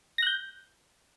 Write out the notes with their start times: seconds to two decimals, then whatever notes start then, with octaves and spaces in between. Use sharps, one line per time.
0.18 A#6
0.22 F#6
0.27 G6